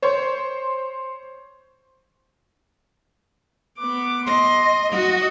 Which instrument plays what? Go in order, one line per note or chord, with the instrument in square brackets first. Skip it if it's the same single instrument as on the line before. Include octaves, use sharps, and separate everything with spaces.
[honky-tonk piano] C5 C#5 C6
[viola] B3 D6
[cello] D#5 [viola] C6
[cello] F#4 [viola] D#5